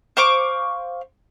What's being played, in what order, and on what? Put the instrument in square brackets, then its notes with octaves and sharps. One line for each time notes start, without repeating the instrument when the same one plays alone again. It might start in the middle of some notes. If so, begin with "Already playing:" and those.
[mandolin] C5 F5 C#6 D6